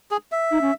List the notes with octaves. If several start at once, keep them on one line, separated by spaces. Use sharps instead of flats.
G#4
E5
D#4
C#4